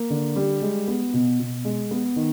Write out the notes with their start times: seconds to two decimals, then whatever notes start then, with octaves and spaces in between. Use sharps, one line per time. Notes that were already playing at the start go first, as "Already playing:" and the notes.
Already playing: A#3
0.10 D3
0.36 G3
0.62 G#3
0.88 B3
1.14 B2
1.40 B2
1.65 G#3
1.91 B3
2.16 D#3